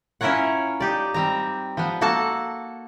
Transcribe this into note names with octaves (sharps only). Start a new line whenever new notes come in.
C#4 E4 F4 A#4 C#5 F#5
D#4 G4 D5
G3 C4 A#5
F3 B3
A#3 F#4 A4 A5